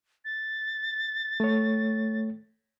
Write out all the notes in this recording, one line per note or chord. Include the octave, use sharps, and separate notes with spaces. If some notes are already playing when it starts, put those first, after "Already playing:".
A6
A3 C#5